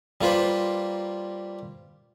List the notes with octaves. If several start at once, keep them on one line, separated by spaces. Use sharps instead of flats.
G3 A#3 F4 B4 C5